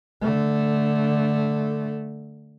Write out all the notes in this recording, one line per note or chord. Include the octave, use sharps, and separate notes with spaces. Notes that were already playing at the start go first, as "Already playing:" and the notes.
D3 A3